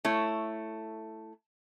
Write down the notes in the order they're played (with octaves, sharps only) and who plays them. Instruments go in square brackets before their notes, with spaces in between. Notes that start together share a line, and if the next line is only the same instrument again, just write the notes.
[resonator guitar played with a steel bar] A3 E4 C#5